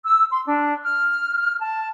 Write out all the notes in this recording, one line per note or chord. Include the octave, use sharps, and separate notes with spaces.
E6
C6
D4
F6
A5